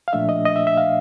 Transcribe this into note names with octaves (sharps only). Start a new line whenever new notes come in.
F5
A#2 F3 A3 D4 E5
D#5
D#5
E5
E5
F5